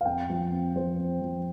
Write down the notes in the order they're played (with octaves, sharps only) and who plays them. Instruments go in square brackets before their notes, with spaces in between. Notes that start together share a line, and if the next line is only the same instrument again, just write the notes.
[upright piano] F5
F2 G5
F3
C4
F3 C5
C4
F3